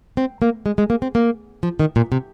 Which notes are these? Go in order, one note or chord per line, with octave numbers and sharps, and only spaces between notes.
C4
A#3
G#3
G#3
A#3
C4
A#3
F3
D#3
A#2
C3